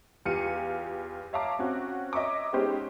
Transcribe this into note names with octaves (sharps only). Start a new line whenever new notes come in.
E2 F4 G4 F5 C#7 D#7
C#5 E5 F5 A5 A#5 D6
C4 C#4 F#4
C#5 D#5 E5 A#5 C#6 D6
G#3 B3 C#4 D#4 G4 C5